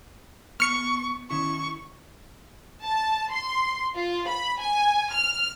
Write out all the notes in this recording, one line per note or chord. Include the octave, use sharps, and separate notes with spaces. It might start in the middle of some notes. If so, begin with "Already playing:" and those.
B3 C#6 F6 C#7
D#3 C#4 E4 C#6
A5
C6
F4
B5
G#5
F6